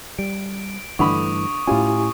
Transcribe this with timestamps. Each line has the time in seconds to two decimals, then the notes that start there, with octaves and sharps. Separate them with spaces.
0.19 G3 D7
0.99 G2 D3 E3 A3 B5 C#6 D#6
1.67 A2 C#4 E4 F4 G4 G#5